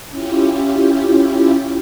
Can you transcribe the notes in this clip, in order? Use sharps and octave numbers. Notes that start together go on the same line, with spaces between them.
C#4 E4 F4 G4